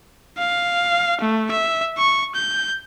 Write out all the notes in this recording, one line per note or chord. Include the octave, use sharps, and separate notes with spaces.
F5
A3
E5
C#6
G6